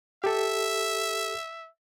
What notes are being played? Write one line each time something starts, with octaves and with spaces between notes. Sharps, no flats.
G4 A4 E5